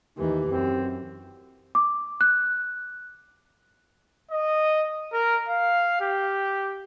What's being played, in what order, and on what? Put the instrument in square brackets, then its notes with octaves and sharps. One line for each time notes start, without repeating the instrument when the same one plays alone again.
[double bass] D#2 E3 [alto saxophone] D#4 [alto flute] G4
[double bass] F#2 [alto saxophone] C4
[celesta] D6
F#6
[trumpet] D#5
A#4
F5
G4